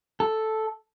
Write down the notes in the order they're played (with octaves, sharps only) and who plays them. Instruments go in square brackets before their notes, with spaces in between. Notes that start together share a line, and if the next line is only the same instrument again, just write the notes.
[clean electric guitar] A4